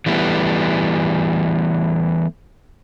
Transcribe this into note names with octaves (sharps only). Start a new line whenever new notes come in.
E3 G3 A3 B3